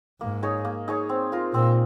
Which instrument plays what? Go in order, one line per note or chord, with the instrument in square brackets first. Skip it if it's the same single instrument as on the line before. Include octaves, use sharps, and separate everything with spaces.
[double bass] G#2 [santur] A#3
[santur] D#4 G#4 C#5
A#3
D#4 G#4 C#5
C4
F4 A#4
[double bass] A#2 [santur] C4